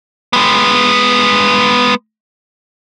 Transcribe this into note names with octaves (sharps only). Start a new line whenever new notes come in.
G#3 B3